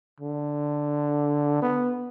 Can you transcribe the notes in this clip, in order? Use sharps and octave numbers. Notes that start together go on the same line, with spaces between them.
D3
B3